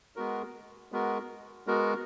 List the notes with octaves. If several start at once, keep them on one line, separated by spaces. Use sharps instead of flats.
G#3 B3 F#4 A#4
G#3 B3 F#4 A#4
G#3 B3 F#4 A#4